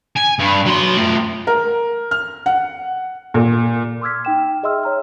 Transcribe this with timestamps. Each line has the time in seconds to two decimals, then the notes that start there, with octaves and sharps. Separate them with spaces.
0.16 G#5
0.39 G2
0.65 F#3 C6
0.97 A3 F4
1.47 A#4
2.11 F6
2.46 F#5
3.34 A#2
4.02 C6 D6 E6 F6 G#6 B6
4.25 D#4 G5 E7
4.63 G#4 D#5 E5 C6 E6 F6
4.83 C#5 A#5 F6